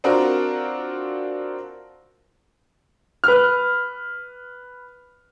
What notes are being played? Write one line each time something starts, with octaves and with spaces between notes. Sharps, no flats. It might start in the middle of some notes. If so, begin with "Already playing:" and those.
C4 D4 F4 F#4 A#4
B4 F6